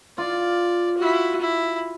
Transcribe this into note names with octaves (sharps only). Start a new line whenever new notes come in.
F4 D5
E4 F#4
E4